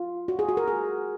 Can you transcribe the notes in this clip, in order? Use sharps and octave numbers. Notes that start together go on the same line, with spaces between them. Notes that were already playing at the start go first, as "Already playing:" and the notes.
Already playing: F4
F#4
G#4
F#4
A#4
G#4